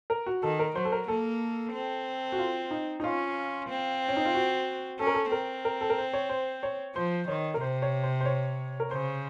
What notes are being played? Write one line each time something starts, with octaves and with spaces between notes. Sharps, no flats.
A#4
F#4
D#3 A4
A#4
F#3 C5
A4
A#4
A#3 A4
C4
F#4
F4
D#4
D#4
C#4 F4
C4
C#4
D#4
F4
F#4
C#4 A4
A#4
A4
C4 A#4
A#4
A4
A#4
C5
C#5
C5
C#5
F3 C5
D#3 C#5
A#4
C3 C5
C#5
C5
C5
C#5
A#4
C#3 C5